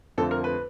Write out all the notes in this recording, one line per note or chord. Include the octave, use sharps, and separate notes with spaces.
F2 D3 F3 A3 C4 A4
A#4
B4